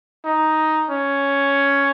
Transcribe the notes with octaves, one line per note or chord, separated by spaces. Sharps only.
D#4
C#4